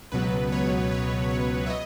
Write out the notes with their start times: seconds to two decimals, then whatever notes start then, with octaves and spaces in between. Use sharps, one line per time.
0.12 C#2 B2 F#3 B3 B4
0.52 C#5
0.91 C#5
1.30 C#5
1.66 E5
1.70 D#5